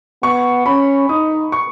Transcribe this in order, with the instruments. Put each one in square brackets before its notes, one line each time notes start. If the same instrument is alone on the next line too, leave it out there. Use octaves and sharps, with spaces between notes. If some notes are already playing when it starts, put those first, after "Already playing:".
[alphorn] B3 [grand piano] C#6
[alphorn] C#4 [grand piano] B5
[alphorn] D#4 [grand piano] D#6
[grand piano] C#6